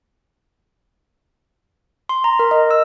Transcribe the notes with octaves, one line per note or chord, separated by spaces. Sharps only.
C6
A#5
A#4
D#5
E6